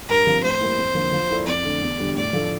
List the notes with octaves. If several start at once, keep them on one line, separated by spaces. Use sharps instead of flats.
G2 A#4
F3 C4 G4
A2 C5
G3 A#3 E4
F2
D3 F3 A#3 F4
F3
A#3 E4 A4 D5
F2 D5
D3 A3
E2
D3 G3
A2 D5
F3 A3 D4 A4